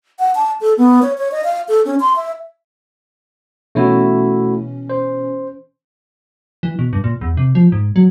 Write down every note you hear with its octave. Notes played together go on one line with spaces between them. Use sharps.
F#5
A5
A4
B3
C#5
C#5
D#5
F5
A4
C#4
C6
E5
B2 E3 A3 C#4 E4 F#4
C5
E3
B2
G2
A#2
E2
C3
F3
G#2
F#3